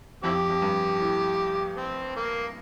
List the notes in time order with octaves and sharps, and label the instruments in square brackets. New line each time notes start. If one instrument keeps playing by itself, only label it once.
[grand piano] F2 [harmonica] C4 E4 G4
[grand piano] F2
G2
A2
[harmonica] C4
A#3